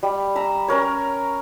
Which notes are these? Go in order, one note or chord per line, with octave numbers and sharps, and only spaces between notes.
G3
A#5 B5 E6
C#4 A#4 C#5